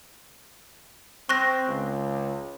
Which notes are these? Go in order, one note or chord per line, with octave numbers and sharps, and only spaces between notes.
C4 C#6 F#6 A#6
C#2